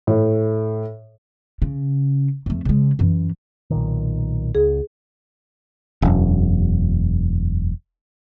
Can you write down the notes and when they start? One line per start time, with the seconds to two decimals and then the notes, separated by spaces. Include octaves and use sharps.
0.07 A2
1.62 C#3
2.46 F2 A3
2.65 C#3 G#3
2.99 F#2 E3
3.70 B1 A#2 D#3
4.55 C#2 G#4
6.02 E1 F#2